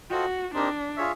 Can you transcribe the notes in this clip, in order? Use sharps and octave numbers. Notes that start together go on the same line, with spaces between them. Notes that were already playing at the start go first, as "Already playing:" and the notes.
F4 F#4 A4 C5 D#5 G5
C4 D4 D#4 G4 A#4
F4 G#4 C#5 E5